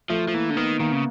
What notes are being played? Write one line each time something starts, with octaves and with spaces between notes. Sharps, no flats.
F3 A3
F3
E3 A#3
D3
D#3 B3
D#3 A#3
C#3